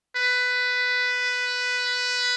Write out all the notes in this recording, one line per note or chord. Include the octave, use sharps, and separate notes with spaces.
B4